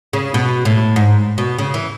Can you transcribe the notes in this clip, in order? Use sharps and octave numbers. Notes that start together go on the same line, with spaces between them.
C#3
B2
A2
G#2
B2
C#3
E3